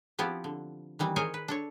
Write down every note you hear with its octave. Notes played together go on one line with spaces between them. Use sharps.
F3 B3 C4 E4 G4
D3
D#3 E3 G3 C4
G#4 A#4 C5 C#5 D#5 G#5
B4
D4 A4 C#5